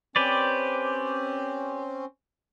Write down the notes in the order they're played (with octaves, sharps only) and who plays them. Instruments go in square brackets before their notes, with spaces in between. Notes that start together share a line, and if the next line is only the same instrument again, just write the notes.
[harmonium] C4 C#4 C5 [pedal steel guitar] G4 B4 D5